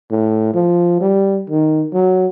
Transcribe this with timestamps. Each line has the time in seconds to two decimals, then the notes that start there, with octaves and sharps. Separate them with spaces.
0.12 A2
0.55 F3
1.01 G3
1.50 D#3
1.94 F#3